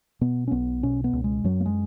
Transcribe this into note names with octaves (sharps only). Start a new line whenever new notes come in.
B2 B3
C#4
B1 B3
B2 C#4
B3
C#2
G#3
F#2 F#3
A#3
G#3